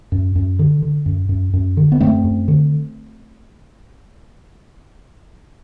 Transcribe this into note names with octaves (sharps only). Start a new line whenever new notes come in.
F#2
F#2
D3
D3
F#2
F#2
F#2
D3
B3
F#2 A3 C4
F#2
D3